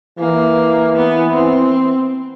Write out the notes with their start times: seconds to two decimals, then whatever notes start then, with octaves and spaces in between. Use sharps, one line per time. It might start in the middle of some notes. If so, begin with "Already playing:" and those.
0.19 E3 A#3
0.96 B3
1.32 C4